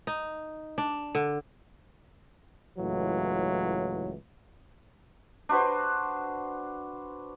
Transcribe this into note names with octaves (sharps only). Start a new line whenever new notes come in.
D#4
D4
D3
C#2 A2 E3 F#3
D4 F#4 B4 C5